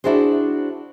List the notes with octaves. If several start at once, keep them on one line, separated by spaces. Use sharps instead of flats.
D4 E4 F#4 G#4 C5